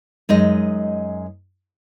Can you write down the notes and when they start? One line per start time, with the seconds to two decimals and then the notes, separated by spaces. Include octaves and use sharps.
0.29 F#2 G#3 D#4 D#5